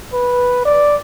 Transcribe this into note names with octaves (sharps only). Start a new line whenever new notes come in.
B4
D5